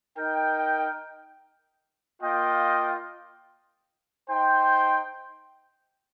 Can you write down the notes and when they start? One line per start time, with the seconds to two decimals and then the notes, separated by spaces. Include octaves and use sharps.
0.16 D#4 A#4 G5
2.22 A#3 F4 D#5 G5
4.27 D#4 C5 G5